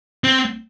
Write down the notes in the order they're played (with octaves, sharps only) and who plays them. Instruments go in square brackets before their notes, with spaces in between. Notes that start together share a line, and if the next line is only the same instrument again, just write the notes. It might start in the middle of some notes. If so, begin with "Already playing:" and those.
[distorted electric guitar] C4